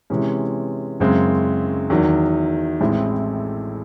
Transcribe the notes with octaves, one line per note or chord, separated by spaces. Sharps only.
C3 E3 G#3 C#4
F#1 F#2 C#3 G#3 C4
E2 D#3 F#3
A1 A2 G#3 C4 E4